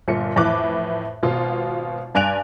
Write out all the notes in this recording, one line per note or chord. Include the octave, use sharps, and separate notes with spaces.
G1 A#2 C#7
F2 A2 E3 B4 D6 F#6
G#1 B2 F4
G2 D5 G#5 F#6 D7 F7